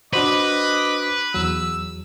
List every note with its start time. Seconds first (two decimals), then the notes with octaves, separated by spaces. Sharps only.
0.13 D4 F#4 B4 C5 D#5 D6
1.34 E2 F#3 E6